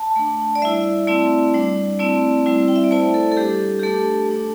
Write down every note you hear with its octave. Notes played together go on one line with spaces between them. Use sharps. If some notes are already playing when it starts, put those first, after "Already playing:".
Already playing: A5
A3 D4
D5
G3 E4 E5
A3 C4 E4 D5
G3 D4
A3 C4 E4 D5
G3 C4 E4
G5
E5
D5
A3 E4 C5
A4
A4
G3 D4 G4
G4
A3 D4 A4
A3 D4